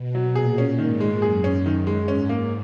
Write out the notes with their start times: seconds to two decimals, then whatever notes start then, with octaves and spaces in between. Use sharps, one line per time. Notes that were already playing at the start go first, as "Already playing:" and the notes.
Already playing: B2
0.15 F#3
0.35 A#2 G#4
0.58 C#4
0.78 G#2 D#3
1.00 G#3
1.22 F#2 G#4
1.44 C#4
1.66 D#3
1.87 G#3
2.08 G#2 C#4
2.29 A#3